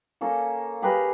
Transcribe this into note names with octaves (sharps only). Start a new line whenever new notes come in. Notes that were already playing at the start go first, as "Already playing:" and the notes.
A#3 C#4 A4
G4 G#4 A#4 B4